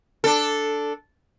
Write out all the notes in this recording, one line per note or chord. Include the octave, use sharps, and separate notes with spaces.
D4 A4